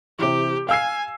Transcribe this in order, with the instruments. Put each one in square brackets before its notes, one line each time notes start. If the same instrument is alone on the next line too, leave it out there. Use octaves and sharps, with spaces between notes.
[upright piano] C3 E3 [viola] G4
[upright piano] F5 E6 C7 [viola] G#5